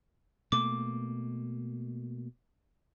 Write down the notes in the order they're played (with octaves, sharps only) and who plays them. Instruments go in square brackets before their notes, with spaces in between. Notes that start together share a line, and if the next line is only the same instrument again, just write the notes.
[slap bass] B2 A3 A#3 [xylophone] D6